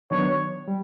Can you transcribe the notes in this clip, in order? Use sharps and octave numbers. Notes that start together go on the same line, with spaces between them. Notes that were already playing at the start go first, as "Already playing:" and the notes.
D#3 F#3 B3 D4 C#5
G3